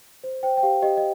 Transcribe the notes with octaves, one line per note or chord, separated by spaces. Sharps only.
C5
C5 G5
G5
G4 F5
G4 D#5
D#5